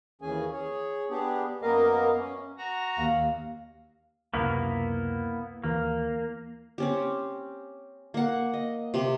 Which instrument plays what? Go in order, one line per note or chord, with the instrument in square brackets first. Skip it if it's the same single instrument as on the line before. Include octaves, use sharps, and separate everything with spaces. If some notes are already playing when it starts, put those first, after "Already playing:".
[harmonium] D#2 E3 C#4 G#4 G#5
G#4 C#5
B3 D4 G4 G#4
F#2 A#3 B3 A#4 D#5 F5
C#4
[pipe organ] F#4 A#5
[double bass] D#2 [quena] F5
[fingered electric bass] C#2 F#2 C3 [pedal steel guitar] A#3 B3 E4
[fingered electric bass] D#2 E3 [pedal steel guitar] A#3
[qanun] C4 C#4 G4
A#3 F#5
D#5
C3 G4 C6